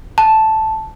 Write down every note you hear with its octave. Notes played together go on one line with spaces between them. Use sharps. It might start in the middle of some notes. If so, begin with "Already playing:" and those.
A5